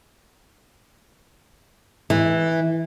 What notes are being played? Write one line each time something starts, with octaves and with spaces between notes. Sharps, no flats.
E3